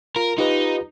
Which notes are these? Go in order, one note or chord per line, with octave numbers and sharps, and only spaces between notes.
F4 A#4
D#4 F4 G4 B4